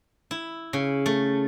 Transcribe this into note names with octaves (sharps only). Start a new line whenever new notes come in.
E4
C#3
A3